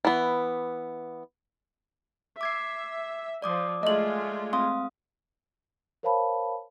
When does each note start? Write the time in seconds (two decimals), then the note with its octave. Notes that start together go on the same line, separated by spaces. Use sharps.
0.05 E3 B3
2.41 E5 D6 G#6 C7
3.42 F3 D5 D6 D#6
3.83 G#3 A3 F4 D#5 F#7
4.53 C4 F5 C6 D#6
6.03 A#4 C5 C#5 F5 A5 B5